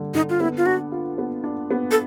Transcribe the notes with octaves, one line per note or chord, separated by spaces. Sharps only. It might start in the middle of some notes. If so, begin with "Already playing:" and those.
Already playing: D3 G3
D3 D#4
F4
B3 E4
F4
D4 F#4
F4
B3
D4
B3
A4